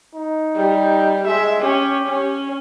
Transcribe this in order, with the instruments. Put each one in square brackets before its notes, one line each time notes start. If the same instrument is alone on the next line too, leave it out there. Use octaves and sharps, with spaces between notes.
[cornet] D#4
[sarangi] G3
[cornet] G#3 [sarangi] E5
[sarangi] C#4 [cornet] G4
[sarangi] C#4